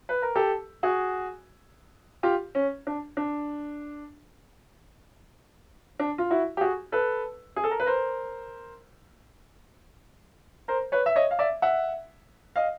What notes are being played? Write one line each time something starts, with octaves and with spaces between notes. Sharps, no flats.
B4
A#4
G4 A4
F#4 G#4
F4 G4
C#4
D4
D4
D4
F4
E4 F#4
G4
F#4 G#4
A4 B4
G#4
A4
A#4
B4
A#4 C5
A#4 C5
B4 C#5
E5
C#5 D#5
F5
D5 E5
E5 F#5
D#5 F5